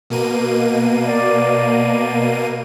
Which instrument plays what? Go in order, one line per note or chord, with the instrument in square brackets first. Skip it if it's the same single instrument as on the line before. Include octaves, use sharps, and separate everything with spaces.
[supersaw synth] B2 A#3 D#7
[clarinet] D5